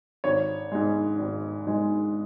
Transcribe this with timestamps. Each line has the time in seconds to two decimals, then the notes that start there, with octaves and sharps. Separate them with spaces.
0.24 G#1 C#5
0.72 G#2 G#3
1.19 G#1
1.67 G#2 G#3